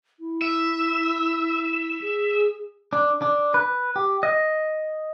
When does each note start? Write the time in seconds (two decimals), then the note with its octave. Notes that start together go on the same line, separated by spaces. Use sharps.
0.20 E4
0.42 E5
2.01 G#4
2.93 D4
3.22 D4
3.54 B4
3.96 G4
4.23 D#5